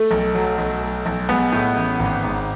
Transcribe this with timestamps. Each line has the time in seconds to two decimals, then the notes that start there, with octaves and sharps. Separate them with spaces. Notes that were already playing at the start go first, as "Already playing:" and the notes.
Already playing: A3
0.11 B1
0.35 F#3
0.58 B1
0.81 A3
1.06 B1
1.29 G#3 B3
1.52 A2
1.76 A1
2.00 G#1
2.24 G#2